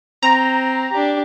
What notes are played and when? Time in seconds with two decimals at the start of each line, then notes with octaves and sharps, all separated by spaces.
0.23 C4 A#5
0.91 D4 G4